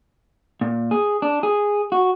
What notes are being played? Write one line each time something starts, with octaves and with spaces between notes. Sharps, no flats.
A#2
G#4
D4
G#4
F#4